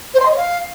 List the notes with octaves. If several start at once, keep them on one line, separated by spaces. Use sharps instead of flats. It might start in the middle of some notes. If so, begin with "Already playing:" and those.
C5
C6
D#5
C#5
F5